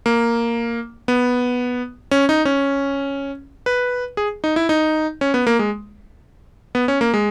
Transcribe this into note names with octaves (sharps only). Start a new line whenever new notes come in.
A#3
B3
C#4
D#4
C#4
B4
G#4
D#4
E4
D#4
C#4
B3
A#3
G#3
B3
C#4
A#3
G#3